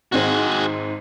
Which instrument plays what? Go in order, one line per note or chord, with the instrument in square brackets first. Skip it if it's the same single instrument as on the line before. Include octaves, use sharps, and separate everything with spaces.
[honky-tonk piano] G#1 G#2 C4 [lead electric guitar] F#4 G#4